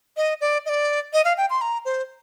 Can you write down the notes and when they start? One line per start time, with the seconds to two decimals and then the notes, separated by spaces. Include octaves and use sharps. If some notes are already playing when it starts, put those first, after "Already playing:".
0.17 D#5
0.41 D5
0.66 D#5
0.69 D5
1.13 D#5
1.25 F5
1.37 G5
1.50 C6
1.61 A#5
1.85 C5